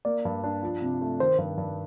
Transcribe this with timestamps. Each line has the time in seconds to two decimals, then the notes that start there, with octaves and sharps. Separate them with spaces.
0.05 A#3 D5
0.25 G2
0.44 D4
0.63 F3
0.82 C3
1.01 A3
1.20 D#3 C5
1.38 G2
1.58 G2